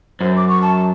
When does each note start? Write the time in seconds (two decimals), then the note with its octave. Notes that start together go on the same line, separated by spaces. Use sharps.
0.21 F#2 C5
0.36 D6
0.49 C#6
0.62 A5